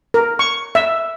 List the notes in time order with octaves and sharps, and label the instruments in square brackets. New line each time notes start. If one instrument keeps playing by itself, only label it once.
[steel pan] A#4
C#6
E5